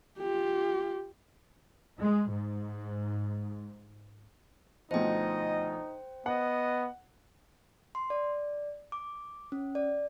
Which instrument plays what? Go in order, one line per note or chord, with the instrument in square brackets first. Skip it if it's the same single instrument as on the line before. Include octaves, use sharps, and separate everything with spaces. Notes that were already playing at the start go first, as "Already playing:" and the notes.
[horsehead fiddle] F4 G4
[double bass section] G#3
G#2
[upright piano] D2 B2 F3 [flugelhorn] D#4 [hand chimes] C5 G5 [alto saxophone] D#5
[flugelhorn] B3 [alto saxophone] D#5 [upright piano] F#5
[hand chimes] C6
D5
D6
C#4
D5